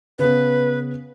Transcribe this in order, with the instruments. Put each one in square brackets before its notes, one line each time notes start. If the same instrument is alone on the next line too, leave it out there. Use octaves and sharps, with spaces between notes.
[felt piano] C#3 B3 [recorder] B4